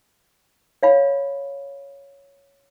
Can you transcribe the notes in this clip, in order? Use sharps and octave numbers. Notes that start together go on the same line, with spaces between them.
C#5 F5 B5